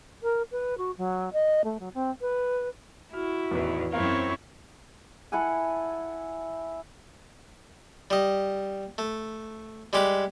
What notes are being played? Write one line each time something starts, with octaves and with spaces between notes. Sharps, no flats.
A#4
B4
F#4
F#3
D#5
A3
F#3
C4
B4
E4 F#4 F6
A1 E2 D#3 B4
F#2 C4 E4 A#4 C#5 F5
E4 A4 F#5 G#5
G3 D#5
A3
G3 G#3 G4 B4